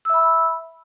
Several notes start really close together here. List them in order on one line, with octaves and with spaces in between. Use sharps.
E6 E5 B5